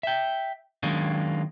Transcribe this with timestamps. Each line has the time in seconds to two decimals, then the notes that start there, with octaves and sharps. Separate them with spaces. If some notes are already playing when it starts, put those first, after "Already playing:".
0.03 E5 G5
0.83 D#3 F#3 G#3 A#3 C#4 D4